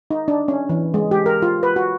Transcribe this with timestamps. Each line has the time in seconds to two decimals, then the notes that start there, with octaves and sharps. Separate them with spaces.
0.11 D#4
0.28 D4
0.48 C#4
0.69 E3
0.94 G#3
1.11 G4
1.26 A#4
1.42 F4
1.63 B4
1.76 F#4